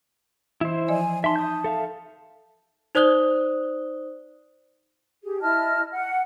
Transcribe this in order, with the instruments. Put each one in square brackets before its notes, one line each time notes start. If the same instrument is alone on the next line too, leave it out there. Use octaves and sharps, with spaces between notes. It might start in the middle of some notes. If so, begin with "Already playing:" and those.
[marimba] E3 [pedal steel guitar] E4 C5
[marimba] F3 D5 D#5 [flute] G#5
[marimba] D#4 [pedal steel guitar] E5 C6 [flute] A5
[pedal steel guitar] D#6 G6
A4 E5 F5
[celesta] D#4 C5 D5 D#6 F#6 G7
[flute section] G4 G#4
E4 D#5 A5 F6
F#5